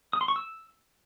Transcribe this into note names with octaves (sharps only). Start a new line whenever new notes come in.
D#6
C6
C#6
E6